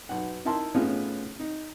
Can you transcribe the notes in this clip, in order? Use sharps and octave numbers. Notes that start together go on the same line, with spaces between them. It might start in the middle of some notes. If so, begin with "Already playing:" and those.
B1 D#4 F#5
D#4 E4 A#4 E5 A5 C6
A2 B3 C#4 D#4 F4 G#4
D#4